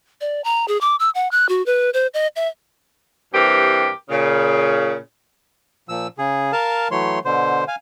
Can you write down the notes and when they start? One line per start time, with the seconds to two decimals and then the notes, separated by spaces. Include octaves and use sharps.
0.21 D5
0.44 A#5
0.68 G#4
0.81 D6
1.00 E6
1.15 F#5
1.31 F#6
1.49 F#4
1.66 B4
1.94 C5
2.14 D#5
2.36 E5
3.33 G2 E3 C4 G4 A#4
4.09 A#2 C#3
5.89 A#2 F3 E6
6.18 C#3 G#4
6.53 A#4 F5 A5
6.91 E3 F#3 A3 C#5 C6
7.25 B2 D3 C5
7.68 F5 G#5